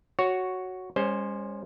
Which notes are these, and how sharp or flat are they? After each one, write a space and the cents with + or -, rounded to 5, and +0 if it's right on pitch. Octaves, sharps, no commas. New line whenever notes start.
F#4 +0 C#5 +0
G#3 -45 C#4 +0 C5 +0